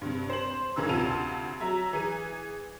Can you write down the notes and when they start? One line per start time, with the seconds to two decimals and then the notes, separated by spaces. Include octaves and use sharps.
0.01 G2 C3
0.30 C5 F#7
0.76 B1 G2 C#3 E3 A#4 E6
0.89 D2 C3 F4 A5 D#7 F7
1.60 F#3 E5 A#5
1.93 E3 G#4 D#7